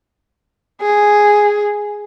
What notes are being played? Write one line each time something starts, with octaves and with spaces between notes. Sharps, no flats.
G#4